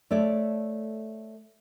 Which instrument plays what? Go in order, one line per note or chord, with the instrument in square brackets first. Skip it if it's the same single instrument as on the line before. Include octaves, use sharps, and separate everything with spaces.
[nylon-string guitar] A3 A4 C#5 D5